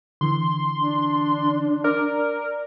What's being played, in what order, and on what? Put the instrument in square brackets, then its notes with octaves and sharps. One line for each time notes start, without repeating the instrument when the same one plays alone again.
[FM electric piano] D3 E3 [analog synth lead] C6
[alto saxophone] D4
[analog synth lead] A#4 [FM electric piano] D5